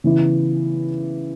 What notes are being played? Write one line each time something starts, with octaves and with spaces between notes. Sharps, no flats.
C#3 E3 B3 E4